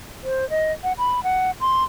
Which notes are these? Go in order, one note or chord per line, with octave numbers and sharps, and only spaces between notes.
C5
D#5
F#5
B5
F#5
C6